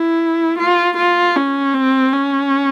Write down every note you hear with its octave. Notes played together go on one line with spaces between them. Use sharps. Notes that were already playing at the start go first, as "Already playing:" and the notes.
Already playing: E4
F4
F4
C#4
C4
C#4